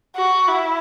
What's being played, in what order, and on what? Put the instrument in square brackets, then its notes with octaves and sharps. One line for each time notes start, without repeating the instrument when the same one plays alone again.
[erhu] F#4
E4